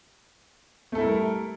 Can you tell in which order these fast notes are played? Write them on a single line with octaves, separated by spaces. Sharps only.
A3 A4 E4 A#4 G3